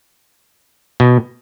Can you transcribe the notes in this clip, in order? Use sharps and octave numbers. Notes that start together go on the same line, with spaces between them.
B2